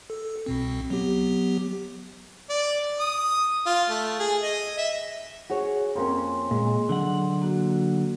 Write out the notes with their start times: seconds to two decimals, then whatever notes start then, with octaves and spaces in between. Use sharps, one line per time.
0.10 A4
0.46 C2 B2 C4
0.90 F#3 B3 G4
2.49 D5
3.00 D#6
3.66 F4
3.90 A3
4.20 G#4
4.42 D#5
4.78 E5
5.50 F#4 G#4 C#5
5.95 F2 A#3 C#4 C6
6.51 A#2 G#3
6.89 D3 F#3 F#5
7.42 A#3 F#4